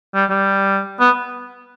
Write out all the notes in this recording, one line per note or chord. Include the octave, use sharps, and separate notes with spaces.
G3
G3
B3